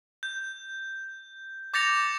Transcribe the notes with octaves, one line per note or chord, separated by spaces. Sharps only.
G6
D6 G6 A6 A#6 C#7 F7